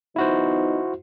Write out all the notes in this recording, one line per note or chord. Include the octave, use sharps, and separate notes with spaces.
F3 B3 D#4 E4 F#4 C5